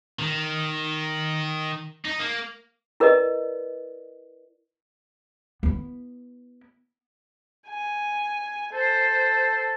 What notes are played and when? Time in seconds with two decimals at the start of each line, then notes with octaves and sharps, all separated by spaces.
0.19 D#3
2.05 D#4
2.19 A#3
3.00 E4 A#4 B4 D5 D#5
5.63 B3 E4
7.68 G#5
8.73 A4 C5